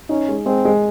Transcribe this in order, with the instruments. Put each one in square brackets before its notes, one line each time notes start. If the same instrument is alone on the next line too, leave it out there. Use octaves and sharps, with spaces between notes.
[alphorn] C#4 [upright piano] D#4
[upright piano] G#3
[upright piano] G#3 [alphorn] C4
[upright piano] G#3